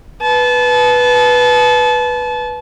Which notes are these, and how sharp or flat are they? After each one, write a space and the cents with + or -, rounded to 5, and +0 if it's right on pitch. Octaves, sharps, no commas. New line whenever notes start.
B4 -5 A5 -30